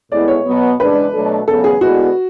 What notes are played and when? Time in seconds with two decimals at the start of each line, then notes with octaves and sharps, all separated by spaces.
0.11 A2 G#3 B3 E4 D5
0.28 C#5
0.46 B2 F#3 B3
0.80 E2 C#3 G#3 D4 B4
1.13 B2 F#3 A3 D4 A4
1.47 E2 C#3 F#3 B3 A4
1.64 G#4
1.81 D3 G#3 B3 E4 F#4 B4